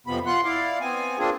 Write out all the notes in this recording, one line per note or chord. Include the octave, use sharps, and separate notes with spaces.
F2 C3 F3 B3 B5
F4 F#5 C6 F#6
E4 D5 F5
B3 C4 G#5
A#3 C4 D4 F4 G#4